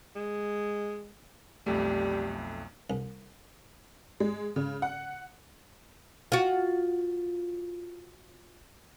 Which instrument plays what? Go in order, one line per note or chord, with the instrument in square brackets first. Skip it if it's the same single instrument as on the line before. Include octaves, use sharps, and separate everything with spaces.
[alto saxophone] G#3
[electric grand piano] B1 F2 A3 [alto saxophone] G3
[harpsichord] C2
[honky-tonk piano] G#3
C#3
F#5
[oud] F4 F#4